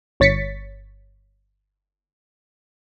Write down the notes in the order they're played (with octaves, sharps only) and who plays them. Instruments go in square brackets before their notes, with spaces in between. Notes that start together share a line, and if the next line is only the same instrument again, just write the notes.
[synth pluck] G1 C#5 A6 B6 C#7